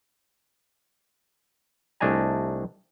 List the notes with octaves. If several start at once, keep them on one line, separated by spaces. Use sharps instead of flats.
C2 A3 D4 D#4 G#5 A#5